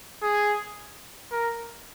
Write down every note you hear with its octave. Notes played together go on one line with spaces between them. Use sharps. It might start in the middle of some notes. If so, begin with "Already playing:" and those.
G#4
A#4